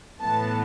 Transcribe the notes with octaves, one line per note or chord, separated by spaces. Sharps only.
A2 E3 B3 A5